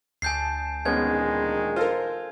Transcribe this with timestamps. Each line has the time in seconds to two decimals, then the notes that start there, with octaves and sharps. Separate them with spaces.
0.22 D2 G#5 A5 G6 C7
0.85 A#1 D#3 G#3 B3 C#4 G#6
1.76 F4 A4 A#4 C5